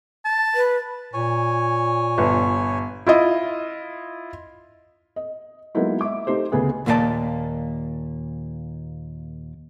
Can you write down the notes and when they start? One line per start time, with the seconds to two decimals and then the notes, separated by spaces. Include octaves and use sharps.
0.25 A5
0.55 B4
1.13 A#2 C#5 G#5
2.18 G1
3.07 E4 F4 D#5
5.16 D#5
5.75 F#3 G#3 A#3 B3 D#4 E4
6.01 E5 D6
6.27 A3 D#4 G4 C5
6.52 D2 C#3 B3 G#4
6.86 D#2 A#2 A#3 F4 D5 A5